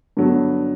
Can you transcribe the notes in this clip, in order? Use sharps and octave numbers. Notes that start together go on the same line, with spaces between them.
G2 D3 F#3 B3